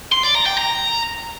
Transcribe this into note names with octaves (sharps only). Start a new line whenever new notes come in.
C6
D5
A#5
G5
A#5